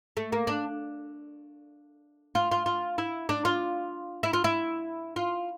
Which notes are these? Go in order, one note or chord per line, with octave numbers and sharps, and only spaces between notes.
A3
A#3
D4
F4
F4
F4
E4
D4
F4
E4
F4
E4
F4